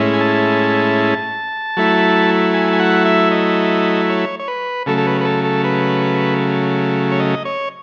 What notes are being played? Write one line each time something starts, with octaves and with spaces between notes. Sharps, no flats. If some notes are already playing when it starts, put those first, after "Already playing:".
Already playing: A2 G#3 C#4 E4
G#5
A5
F#3 A3 E4
G#5
G#5
F#5
E5
D#5
C#5
C#5
B4
C#3 F#3 A3 A4
A4
B4
B4
A4
A4
B4
C#5
D#5
C#5